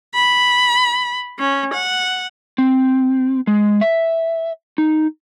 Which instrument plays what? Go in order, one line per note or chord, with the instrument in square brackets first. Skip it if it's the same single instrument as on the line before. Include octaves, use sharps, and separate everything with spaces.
[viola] B5
C#4
F#5
[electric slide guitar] C4
G#3
E5
D#4